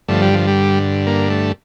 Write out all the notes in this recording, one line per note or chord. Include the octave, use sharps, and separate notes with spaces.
G2 D3 F3 A3
G3
F3
G3
A#3
A3